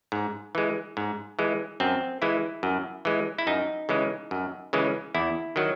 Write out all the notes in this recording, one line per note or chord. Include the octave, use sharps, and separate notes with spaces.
G#2
E3 G#3
G#2
E3 G#3
F#2 C4
E3 G#3 E4
F#2
E3 G#3
E4
F#2 D#4
C#3 E3 G#3
F#2
C#3 E3 G#3
E2 E4
D#3 F#3